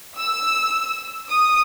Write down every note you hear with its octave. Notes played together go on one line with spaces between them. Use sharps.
E6
D#6